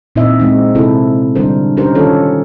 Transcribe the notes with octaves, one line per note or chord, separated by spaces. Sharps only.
A#2 C4 D#4 E4 D#5 E5
G#3 C4 D#4
C3 C4 E4 A4
D3 G3 D4 A#4 C5
C#4 D#4 G4 A#4 C5
D#3 C#4 F4 A4 C#5